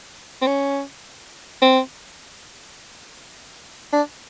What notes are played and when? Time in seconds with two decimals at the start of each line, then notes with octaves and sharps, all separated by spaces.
0.42 C4
0.47 C#4
1.62 C4
3.93 D4